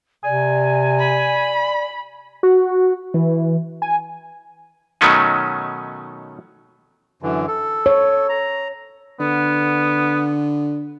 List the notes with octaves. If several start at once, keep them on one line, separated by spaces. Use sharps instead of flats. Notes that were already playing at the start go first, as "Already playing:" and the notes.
C3 D5 G#5
B5
F#4
E3
G#5
B2 D#3 F#3 A3 C#4 D#4
F#2 D3 E3
A4
C#5
A#5
D3 B3